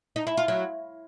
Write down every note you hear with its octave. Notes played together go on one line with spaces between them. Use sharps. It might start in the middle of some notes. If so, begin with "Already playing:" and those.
D#4
E4
F4
F#3